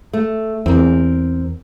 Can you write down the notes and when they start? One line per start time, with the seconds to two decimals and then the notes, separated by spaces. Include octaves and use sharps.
0.13 A3
0.66 E2 C4 A#4